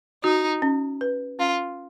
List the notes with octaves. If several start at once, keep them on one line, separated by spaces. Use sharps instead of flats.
D#4 F#4
C#4
B4
C#4 F4